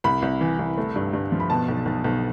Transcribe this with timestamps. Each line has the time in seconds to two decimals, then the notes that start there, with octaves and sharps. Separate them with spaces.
0.04 C2 B5
0.22 C2
0.41 E3
0.59 C2
0.78 A3
0.96 G2
1.13 G2
1.32 F3
1.40 B5
1.50 B2 A5
1.68 B1
1.86 B1
2.04 B1